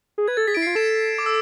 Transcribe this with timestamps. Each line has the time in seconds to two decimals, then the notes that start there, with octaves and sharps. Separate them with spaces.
0.18 G#4
0.28 B4 G#6
0.37 A4 A6
0.47 G#4 B6
0.55 E4 D7
0.62 F4 C7
0.75 A4 E7
1.18 D6
1.26 E6